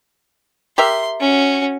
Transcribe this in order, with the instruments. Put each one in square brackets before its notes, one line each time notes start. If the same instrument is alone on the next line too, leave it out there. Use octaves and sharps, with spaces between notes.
[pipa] G4 A#4 E5 [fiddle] C6
[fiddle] C#4 F#4